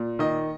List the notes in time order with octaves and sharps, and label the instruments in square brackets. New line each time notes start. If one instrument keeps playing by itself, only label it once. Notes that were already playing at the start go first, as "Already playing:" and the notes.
Already playing: [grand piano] A#2
D#3 D#5